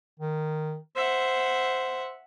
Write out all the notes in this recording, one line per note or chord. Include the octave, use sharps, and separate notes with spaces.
D#3
C5 E5 F#5